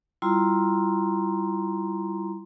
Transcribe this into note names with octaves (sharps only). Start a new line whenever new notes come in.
G3 E4 F4 A#5 C6